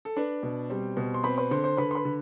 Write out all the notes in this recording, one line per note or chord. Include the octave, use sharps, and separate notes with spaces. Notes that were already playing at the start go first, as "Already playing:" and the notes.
A4
D4 B4
B2
G3 C4 C5
B2
C6
C4 B4 B5
B4 B5
D3 C5 C6
C5 C6
D3 B4 B5
C6
B4 B5
D3